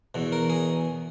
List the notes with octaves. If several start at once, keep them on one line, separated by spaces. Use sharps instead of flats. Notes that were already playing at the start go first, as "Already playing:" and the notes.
E2 B2
A#4
G#4